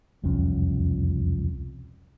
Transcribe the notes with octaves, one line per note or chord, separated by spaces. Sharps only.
E1 C2 F2 C#4